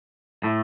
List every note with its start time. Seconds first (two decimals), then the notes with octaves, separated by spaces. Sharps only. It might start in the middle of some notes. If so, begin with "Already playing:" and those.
0.43 A2 A3